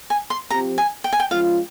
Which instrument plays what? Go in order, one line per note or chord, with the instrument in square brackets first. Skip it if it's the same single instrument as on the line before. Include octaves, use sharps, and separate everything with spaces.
[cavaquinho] G#5
C6
[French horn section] F3 C4 G4 [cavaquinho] A#5
[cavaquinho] G#5
G5
G#5
G5
[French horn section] F3 G#3 C#4 F4 [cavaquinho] F5